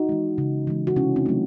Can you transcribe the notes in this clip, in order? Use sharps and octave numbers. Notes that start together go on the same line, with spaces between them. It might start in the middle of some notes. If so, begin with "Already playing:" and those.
Already playing: D#4 F#4
E3 G#3
C#3
E3 G#3
F#4
C3 C#4 E4
C4 D#4
F#3 A3